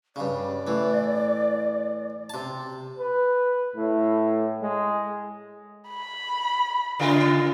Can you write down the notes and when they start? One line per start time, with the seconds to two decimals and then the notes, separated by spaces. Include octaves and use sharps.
0.16 G2 C#3 D5
0.67 A2 E3
2.30 C3 A5
2.99 B4
3.76 A2
4.62 G#3
5.88 B5
6.99 C#3 F4 A#4